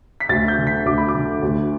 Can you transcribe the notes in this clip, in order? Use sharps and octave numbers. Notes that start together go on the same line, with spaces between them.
B6
D2 A6
G6
D3
B6
D2 D6
B5
D6
D3
D2